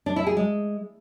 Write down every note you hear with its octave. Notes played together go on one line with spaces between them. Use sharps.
D4
E4
G#4
G#3